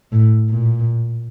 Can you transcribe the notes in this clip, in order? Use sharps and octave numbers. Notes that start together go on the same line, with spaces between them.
A2
A#2